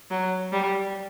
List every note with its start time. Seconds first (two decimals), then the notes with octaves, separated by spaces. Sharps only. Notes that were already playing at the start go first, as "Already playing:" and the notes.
0.11 F#3
0.52 G3